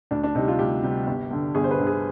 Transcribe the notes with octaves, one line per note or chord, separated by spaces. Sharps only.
D2 D4
D4
C3 G3 D#4
F4
D2 G4
C3 G3
G1
G2 D3
G1 G#4
C5
B4
G2 D3
G#4